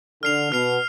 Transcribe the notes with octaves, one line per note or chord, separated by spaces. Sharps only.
D3 F6 C7 F7
B2 F6 C7 F7